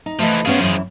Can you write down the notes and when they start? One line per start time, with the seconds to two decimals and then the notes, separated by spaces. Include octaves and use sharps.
0.06 D#4
0.19 E3 F3 A3 B4 D#5
0.45 F3 B3 C#4 G#4 F5
0.60 F#2 E3